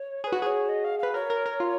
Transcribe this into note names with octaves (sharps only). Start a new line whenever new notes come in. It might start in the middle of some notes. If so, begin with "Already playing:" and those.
Already playing: C#5
G#4 B4 C#5
F#4
G#4 C#5
D#5
F5
B4 F5
A#4 C#5
A#4
A#4
F4